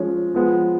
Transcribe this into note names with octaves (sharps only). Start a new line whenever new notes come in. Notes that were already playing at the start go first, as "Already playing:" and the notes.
Already playing: F3 G#3 C#4
F3 G#3 B3